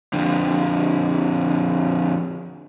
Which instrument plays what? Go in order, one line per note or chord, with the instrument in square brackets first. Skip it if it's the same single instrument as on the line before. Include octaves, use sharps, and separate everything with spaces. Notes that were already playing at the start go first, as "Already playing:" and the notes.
[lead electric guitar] F2 D3